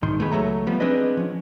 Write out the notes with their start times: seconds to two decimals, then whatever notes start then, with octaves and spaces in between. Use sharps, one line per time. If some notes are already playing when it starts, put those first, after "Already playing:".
0.02 C2 G#2 D#3 C6
0.20 A3 B3 G#4 B4
0.32 C#2 G2 F#3 A3 A#5
0.67 F3 G3 B3
0.80 B3 C4 D4 G#4 B4 D#5
1.17 F3 C#4